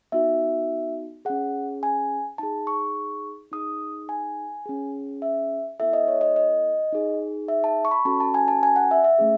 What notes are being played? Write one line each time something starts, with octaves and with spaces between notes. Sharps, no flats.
B3 D#4 F#4 E5
C#4 G#4 F#5
G#5
D#4 G#4 A5
C#6
D#4 G#4 D#6
G#5
C#4 G#4
E5
B3 E4 A4 E5
D#5
C#5
D#5
D#5
D#4 G#4
E5
A5
C#6
B5
C#4 F#4 A4 A5
A5
G#5
A5
G#5
F#5
E5
E5
A3 C#4 G#4